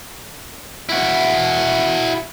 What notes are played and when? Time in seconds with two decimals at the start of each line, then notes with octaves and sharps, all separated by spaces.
0.89 E4 F#4